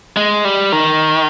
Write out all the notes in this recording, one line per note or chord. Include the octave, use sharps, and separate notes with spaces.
G#3
G3
D#3